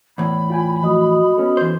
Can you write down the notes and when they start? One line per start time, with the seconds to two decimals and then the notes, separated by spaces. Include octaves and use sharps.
0.18 E2 A2 B5
0.50 F4 G5 G#5
0.83 F3 A3 F#4 D#5 D#6
1.37 B3 C#4 A4
1.57 E3 C5